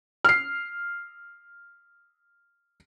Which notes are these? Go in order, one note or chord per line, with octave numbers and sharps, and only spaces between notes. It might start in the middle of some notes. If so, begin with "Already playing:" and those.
F6 C7